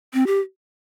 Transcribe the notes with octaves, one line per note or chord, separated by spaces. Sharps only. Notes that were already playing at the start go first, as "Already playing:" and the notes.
C4
G4